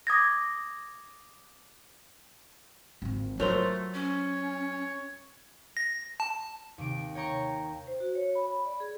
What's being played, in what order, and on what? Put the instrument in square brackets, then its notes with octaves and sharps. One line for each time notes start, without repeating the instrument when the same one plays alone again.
[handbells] D6 D#6 G#6 A#6
[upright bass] G#1 F3
[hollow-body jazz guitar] F#3 A#4 C5 [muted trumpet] A3 [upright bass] F4
[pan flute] C#4 [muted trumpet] C#5
[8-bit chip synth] A#6
A5
[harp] D#2 C3 D7
C#5 G5 A#5 C#6
[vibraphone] C5
F#4
C#5
B5
B5
D5
G#4